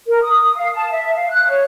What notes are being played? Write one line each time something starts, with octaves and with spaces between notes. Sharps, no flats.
A#4
D#6
D#6
F5
A5
E5
F5
F#6
C#5